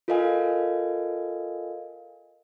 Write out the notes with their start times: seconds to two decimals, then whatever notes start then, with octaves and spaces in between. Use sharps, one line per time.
0.08 F4 A4 A#4 D#5 F5 G#5